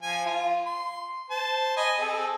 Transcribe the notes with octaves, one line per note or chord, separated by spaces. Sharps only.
F3 G#5
F4
C6
C5 A5
D#5 G#5 B5
C4 G#4 A4